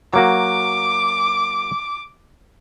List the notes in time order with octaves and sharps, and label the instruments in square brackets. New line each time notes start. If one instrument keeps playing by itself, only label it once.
[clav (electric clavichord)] F#3 A#3 F#4 [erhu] D6